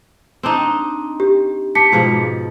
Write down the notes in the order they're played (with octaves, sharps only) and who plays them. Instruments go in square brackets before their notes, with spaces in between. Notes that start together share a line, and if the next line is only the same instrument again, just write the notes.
[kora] C4 D4 D#4
[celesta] G4
[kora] G4 [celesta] A5 B6 C#7
[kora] G#2 B2 F3